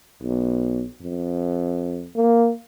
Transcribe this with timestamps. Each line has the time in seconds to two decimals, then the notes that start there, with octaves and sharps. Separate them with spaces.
0.22 B1
1.02 F2
2.15 A#3